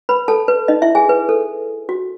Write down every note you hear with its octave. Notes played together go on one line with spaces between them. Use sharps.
B4 B5
A4 A5
B4
D#4 D#5
E4 E5
G#4 G#5
B4
A4
F#4